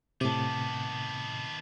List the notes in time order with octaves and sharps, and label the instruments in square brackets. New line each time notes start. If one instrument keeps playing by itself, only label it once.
[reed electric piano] A2 C3 [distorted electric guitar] D#3 B3 [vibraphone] A5 D6